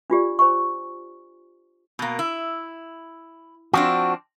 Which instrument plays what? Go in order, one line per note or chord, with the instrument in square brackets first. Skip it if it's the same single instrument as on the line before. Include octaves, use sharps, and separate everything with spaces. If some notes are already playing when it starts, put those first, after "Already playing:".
[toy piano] D4 F4 G4 D5
C5 G#5 C#6
[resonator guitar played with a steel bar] B2 A#3
E4
[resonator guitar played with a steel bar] F3 C4 D4 [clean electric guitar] F#4